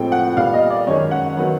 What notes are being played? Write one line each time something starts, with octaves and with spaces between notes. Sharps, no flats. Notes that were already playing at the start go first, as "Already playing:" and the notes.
Already playing: A2 F3 G#3 C4 G5
F#5
A#2 G3 B3 F5
D#5
D5
F#2 D#3 G#3 C#4 C#5
F#5
D#3 F#3 B3